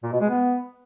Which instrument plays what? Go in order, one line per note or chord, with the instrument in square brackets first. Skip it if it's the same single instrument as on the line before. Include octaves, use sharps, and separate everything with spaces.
[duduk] A#2
B2
G#3
B3